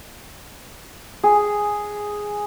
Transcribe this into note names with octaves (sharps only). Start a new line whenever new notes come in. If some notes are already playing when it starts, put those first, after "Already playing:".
G#4